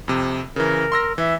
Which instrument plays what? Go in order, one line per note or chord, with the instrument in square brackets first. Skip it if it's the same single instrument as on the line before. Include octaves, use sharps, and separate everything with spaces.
[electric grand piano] F2 C3
[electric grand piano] C#3 E3 [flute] A#4
[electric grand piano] C6 E6 A#6
[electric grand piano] E3 [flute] E5